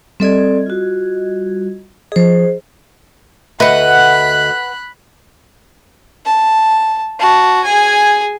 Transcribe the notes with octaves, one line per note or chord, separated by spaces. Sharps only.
G3 C4 A4 D5 D#5 G#6
F4 F#4
F3 G#4 C5 D#5
D2 B4 D#5 E5 F#5 B5 F#6
A5
F#4 A5
G#4 G#5